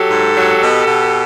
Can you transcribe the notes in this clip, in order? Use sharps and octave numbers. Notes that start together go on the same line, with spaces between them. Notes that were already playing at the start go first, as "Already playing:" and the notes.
Already playing: F#3 G4 A4
G#2
F#3
B2
B2